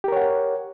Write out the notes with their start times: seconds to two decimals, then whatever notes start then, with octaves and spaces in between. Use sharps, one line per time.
0.04 G4
0.08 A#4
0.12 C#5
0.16 F#5